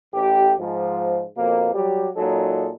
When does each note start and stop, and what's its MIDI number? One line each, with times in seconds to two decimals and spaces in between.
0.14 0.53 33
0.14 0.53 67
0.59 1.23 44
0.59 1.23 53
1.36 1.73 41
1.36 1.73 47
1.36 1.73 58
1.74 2.08 54
1.74 2.08 55
1.74 2.08 67
2.16 2.71 46
2.16 2.71 54
2.16 2.71 56
2.16 2.71 63
2.16 2.71 69